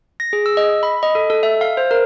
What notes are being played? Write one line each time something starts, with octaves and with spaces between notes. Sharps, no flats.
A#6
G#4
E6
D#5
B5
D#5
A4
A4
E5
F5
C5
A#4